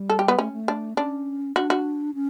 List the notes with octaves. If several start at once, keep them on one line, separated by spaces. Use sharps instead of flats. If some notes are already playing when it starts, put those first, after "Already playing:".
Already playing: G3
A4
G4
B3
A3 C#4
A3
D4
C#4 D4
D4 F#4
F#4
C#4